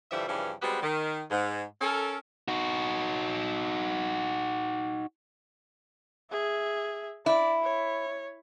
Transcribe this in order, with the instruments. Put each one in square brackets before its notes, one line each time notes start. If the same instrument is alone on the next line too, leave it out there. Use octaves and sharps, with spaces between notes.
[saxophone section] G2 D3 E3 F3 G3 E5
G2 C#3 E3 F3 C#4 D4
G3 G#3 B3 C4 F#4 G4
D#3
G#2
C#4 A4 A#4
[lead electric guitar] D#4 F#4
[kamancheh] G#4 E5
[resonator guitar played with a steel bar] E4 [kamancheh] D5
[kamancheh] C#5